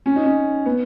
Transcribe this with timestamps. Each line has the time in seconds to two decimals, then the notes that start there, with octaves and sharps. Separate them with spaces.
0.06 C#4
0.16 D#4
0.26 C#4
0.66 B3